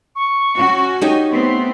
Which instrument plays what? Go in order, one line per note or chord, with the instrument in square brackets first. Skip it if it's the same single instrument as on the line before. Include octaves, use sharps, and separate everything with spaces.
[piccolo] C#6
[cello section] C#4 F#4
[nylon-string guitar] D#4 G4 C#5 [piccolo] D#5
[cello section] A3 B3 C4 [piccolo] C6